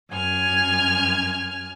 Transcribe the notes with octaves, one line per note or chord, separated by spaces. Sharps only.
F#2 G#5 F6 G#6